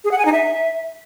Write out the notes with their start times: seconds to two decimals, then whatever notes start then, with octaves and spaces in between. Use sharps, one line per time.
0.04 G#4
0.11 F#5
0.18 G#5
0.25 D#4
0.32 E5